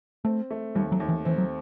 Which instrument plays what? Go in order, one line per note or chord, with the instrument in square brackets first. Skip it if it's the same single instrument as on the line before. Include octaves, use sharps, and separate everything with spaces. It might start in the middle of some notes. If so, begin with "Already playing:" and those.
[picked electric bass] A3 [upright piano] C4
[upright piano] A3
[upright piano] D#2 [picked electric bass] G3
[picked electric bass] F#3
[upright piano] D#2
[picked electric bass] E3
[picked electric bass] E3 [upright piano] C4
[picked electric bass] F#3